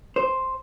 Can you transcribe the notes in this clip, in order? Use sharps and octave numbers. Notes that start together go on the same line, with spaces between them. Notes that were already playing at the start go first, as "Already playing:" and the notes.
C5